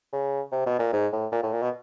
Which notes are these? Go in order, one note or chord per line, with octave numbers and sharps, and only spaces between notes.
C#3
C3
B2
A#2
G#2
A2
A#2
A2
A#2
B2